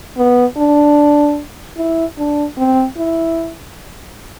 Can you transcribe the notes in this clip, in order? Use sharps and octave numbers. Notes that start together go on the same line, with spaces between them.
B3
D4
E4
D4
C4
E4